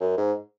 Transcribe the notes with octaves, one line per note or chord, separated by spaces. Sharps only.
F#2
G#2